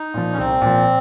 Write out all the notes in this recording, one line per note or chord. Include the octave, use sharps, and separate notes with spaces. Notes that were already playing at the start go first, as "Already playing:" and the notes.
Already playing: D#4
A#2 F3
C#4
C2 C4
A#2 F3